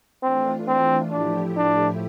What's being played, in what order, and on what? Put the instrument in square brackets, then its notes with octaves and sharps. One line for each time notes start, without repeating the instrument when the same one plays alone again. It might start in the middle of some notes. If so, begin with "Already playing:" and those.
[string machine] E3 A3 D4 F4 [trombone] C4
[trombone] C4
[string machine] A2 F3 A3 E4 G4 [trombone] D4
[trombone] D4